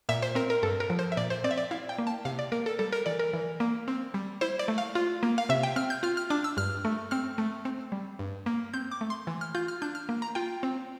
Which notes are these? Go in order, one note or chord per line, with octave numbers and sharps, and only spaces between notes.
A#2 E5
C5
C4 A#4
A#4
G2 A4
A#4
F3
C5
E5
A#2 D5
C5
C4 D5
E5
D5
E4 F5
G5
A#3
A5
C3 F5
D5
A#3 A#4
A4
G3 A4
A#4
E3 D5
A#4
E3
A#3
C4
G3
E4 C5
D5
A3
F5
F4
A#3
F5
C3 E5
G5
C4 F6
G6
F4 F6
F6
D4 D6
E6
G2 F6
A3
C4 F6
A3
C4
G3
G2
A#3
C4 G6
D6
A3
C6
E3
F6
F4 G6
F6
D4 G6
F6
A#3
A#5
F4 G5
C4